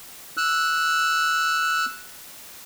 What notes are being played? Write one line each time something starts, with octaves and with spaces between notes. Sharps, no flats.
E6 F#6